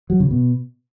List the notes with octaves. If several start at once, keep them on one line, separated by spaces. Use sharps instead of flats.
F#3
C#3
B2